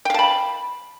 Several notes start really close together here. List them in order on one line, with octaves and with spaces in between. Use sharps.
G5 F5 A5 B5